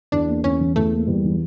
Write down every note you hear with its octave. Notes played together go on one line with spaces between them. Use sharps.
E2 D4
A#3
E2 C#4
E3
E2 A3
A#3
E2 G3
E3